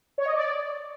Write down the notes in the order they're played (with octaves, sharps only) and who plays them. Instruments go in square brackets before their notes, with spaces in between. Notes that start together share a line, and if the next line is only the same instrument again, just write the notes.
[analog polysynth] C#5
D#5
D5